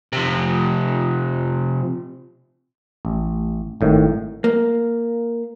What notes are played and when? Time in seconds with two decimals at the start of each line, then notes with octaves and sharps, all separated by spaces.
0.13 C3 F3
3.05 A1
3.81 G#1 A2 D#3
4.44 A#3